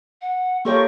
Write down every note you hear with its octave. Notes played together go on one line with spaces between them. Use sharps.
F#5
A#3 F4 G4 A4 A#4 C#5 C#6